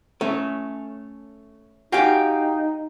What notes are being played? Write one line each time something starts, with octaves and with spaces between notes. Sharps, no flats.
A3 C#4
D#4 F#4 G4 F5 G5 G#5